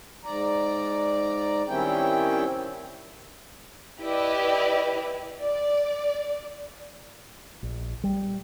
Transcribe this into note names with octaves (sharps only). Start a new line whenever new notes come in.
G#2 D5 A#5
D#3 G3 C4 C#4 E4 G5
E4 G4 B4 D5 D#5
D5
A#1
G3